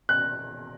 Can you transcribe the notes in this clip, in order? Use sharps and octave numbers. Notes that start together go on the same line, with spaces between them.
F#6